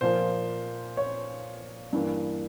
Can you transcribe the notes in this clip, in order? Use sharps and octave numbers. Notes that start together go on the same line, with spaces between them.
A#2 F3 A#3 C5
C#5
G2 E3 A#3